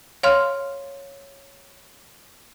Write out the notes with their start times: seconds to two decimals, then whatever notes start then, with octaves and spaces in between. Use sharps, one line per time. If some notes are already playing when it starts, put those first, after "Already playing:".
0.23 C#5 F5 C6 F6